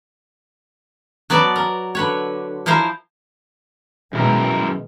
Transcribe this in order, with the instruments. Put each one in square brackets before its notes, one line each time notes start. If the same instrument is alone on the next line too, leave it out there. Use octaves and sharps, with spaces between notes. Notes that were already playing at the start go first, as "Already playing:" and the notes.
[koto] F#3 B3 D5 A5
A#4
D3 B4 C#5
F3 E4 A#4 C5 F5
[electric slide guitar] F#2 E4 A#4 [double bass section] B2 D#3 G#3